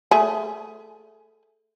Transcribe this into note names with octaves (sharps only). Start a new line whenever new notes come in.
A3 G#4